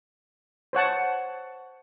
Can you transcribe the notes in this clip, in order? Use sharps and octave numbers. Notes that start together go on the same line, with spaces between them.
C5 C#5 F#5 A5